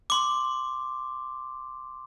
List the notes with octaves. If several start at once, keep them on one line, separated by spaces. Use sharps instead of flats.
C6 D6